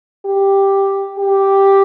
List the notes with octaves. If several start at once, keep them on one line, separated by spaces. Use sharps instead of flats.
G4
G4